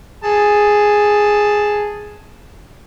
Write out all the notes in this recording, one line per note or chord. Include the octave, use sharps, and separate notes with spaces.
G#4 A5